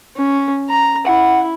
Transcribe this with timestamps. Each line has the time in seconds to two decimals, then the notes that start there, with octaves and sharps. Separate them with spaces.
0.16 C#4
0.69 A#5
1.07 E4 F#5